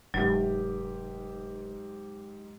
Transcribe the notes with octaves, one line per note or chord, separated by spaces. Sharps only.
F1 G#2 F#3 G4